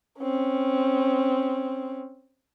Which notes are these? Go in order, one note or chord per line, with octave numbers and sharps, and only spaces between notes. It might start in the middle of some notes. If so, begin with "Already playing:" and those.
C4 C#4